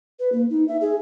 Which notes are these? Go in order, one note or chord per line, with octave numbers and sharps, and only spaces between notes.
B4
A#3
D#4
E5
G#4